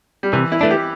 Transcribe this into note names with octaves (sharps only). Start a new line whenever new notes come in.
G3
C3 E3
E4
E3 A3 D4
G4